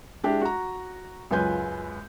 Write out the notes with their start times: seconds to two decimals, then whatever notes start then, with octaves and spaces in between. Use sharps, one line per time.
0.24 G#3 D4 E4 G4
0.42 F#4 A#5
1.31 C#2 F#2 F4 B4 G#5 G6